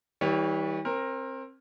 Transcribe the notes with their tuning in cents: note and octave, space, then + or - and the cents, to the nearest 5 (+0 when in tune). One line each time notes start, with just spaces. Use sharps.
E3 -45 G3 +0 C#5 +0
C4 +25 A#4 +0